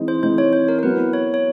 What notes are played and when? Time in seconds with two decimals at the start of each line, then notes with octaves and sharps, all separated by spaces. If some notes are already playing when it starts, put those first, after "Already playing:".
Already playing: E3 G#3 C4 D#4
0.08 C5
0.23 E3 G#3 C4 D#4 C5
0.38 C#5
0.53 C5
0.68 A#4
0.79 A#4
0.83 F#3 B3 E4 B4
1.13 C#5
1.34 C#5